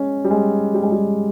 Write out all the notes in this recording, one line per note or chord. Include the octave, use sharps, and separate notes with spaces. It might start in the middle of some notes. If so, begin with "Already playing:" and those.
Already playing: G#3 C#4
G3
G#3
G3
G#3
G3